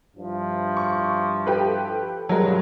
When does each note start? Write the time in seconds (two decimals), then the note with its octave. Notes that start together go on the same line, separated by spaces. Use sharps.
0.17 G2 F3 E4
0.77 C#6
1.46 G4 A4 B4
2.29 G2 F#3 G#3 A#4